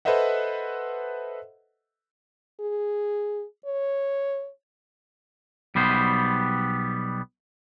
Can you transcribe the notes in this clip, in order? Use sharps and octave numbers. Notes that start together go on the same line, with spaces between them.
A4 B4 C5 D#5 E5 F#5
G#4
C#5
B1 G3 B3 C5